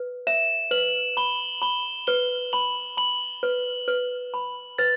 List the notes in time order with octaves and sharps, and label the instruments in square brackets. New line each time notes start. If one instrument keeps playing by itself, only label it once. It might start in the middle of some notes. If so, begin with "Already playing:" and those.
Already playing: [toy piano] B4
[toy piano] E5 [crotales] E7
[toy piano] B4 [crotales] F#7
[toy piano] B5 [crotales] G7
[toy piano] B5 [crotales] G7
[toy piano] B4 [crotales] G7
[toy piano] B5 [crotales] F#7
[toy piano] B5 [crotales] F#7
[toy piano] B4
B4
B5
[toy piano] B4 [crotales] A6